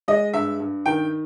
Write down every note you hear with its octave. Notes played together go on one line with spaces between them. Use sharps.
G#3 D#5
G2 E5
G2
D#3 G5